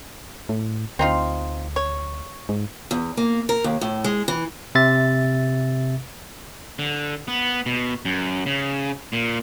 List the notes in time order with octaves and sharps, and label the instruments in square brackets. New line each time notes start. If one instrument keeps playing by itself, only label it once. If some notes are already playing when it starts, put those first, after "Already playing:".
[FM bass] A2
[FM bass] D2 [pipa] C4 D#4 F4
[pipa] C#5
[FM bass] G#2
[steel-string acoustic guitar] E2
A#3
A#4
D#2
A2
G#3
E3
[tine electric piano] C3 E5 A6
[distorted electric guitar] D3
B3
B2
F#2
C#3
A#2